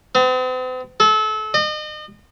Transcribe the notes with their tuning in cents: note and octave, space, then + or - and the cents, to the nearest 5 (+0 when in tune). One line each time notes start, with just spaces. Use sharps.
C4 -45
A4 -30
D#5 -35